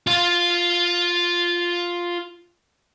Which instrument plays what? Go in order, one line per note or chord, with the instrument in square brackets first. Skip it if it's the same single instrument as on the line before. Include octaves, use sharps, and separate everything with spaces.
[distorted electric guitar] F4 F5